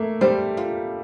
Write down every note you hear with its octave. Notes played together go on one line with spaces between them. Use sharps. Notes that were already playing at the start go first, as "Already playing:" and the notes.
Already playing: A3 A#3
G3 C5
F4